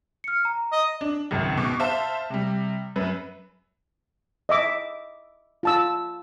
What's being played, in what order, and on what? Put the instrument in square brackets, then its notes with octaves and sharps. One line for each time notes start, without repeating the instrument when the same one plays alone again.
[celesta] F6 C#7
A#5
[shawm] D#5
[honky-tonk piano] D4
G#1 C#2 F#2
B2 D6
C5 E5 F5 A5
C3 G3
F#2 B4
[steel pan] D#5 E5 D6
F4 A5 E6